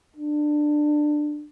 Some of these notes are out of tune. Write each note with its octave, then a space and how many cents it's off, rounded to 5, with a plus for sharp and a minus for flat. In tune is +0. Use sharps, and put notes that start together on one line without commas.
D4 +20